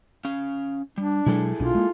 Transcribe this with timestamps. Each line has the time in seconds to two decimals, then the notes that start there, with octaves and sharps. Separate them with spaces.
0.25 C#4 F5
0.98 G3 D4
1.26 B2 F#3 G#3 E4 G#4 A4
1.60 B1 B2 D4 F4
1.75 G#3 A#3